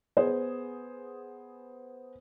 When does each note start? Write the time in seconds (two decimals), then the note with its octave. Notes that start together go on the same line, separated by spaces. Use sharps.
0.17 B3 G#4 C5